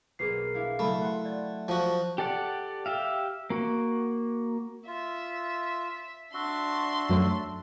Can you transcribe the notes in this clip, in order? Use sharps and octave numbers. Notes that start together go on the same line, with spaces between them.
B1 A#3 G#4 B4 F6 C7
D4 E4 F5
C#3 F#3 A3 B5
F#5 C6
D5 A6
F3 F#4 A5 D#6
G4 A4 D5 F#5
G4 E5 F5
A#3 F#4
F4 E5
D4 F#4 E5 C6
F#2 F#3 A3